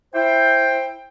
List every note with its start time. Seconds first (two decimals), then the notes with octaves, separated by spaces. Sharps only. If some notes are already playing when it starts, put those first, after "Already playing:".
0.14 E4 C5 G5